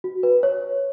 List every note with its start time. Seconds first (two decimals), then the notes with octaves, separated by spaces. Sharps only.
0.04 F#4
0.23 B4
0.43 C#5